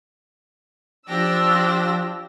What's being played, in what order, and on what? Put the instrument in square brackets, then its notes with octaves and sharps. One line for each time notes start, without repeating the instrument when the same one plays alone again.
[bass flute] F3 [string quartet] D4 G4 A#6 [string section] E6